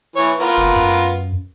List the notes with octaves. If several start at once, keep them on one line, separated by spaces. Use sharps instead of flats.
E3 C#5
B3 F4 A#4
F#1
F#2